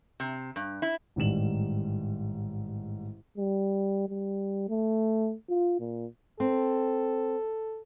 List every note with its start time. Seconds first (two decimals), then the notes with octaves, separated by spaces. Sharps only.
0.20 C3
0.56 G2
0.82 E4
1.16 A1 G#2 D#3 G3 E7 F#7
3.38 G3
4.09 G3
4.69 A3
5.49 F4
5.80 A#2
6.40 C4 A4